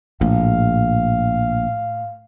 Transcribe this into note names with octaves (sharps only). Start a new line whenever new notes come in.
A#1 A2 F5